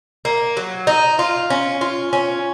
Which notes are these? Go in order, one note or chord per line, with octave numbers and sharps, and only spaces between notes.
A#3
F#3
D#4
F4
C#4
F4
C#4